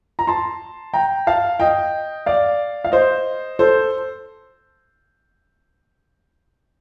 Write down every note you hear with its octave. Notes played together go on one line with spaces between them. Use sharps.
A#5
A5 C6
G5 A#5
F5 A5
D#5 G5
D5 F5
F5
C5 D#5
A4 C5